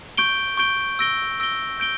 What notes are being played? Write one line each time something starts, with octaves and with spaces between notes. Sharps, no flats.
C#6 G6 D7 G7
C#6 G6 D7 G7
E6 A#6 D7 G7
E6 A#6 D7 G7
G6 D7 G7